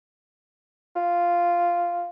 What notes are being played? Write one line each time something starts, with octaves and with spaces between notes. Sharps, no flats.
F4